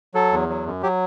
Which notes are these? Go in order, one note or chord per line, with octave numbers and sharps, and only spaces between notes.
F#3 A4
E2
F#3
F#2
F#3 G4